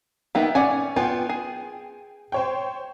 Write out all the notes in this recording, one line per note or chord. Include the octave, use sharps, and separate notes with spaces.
A#3 B3 D#4 E5 G5
C#4 D5 F#5 G#5
B3 F4 G5 G#5
G#4
C5 C#5 G5